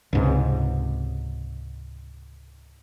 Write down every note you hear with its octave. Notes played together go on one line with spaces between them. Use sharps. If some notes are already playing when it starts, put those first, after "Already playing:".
C#2 G#2 C3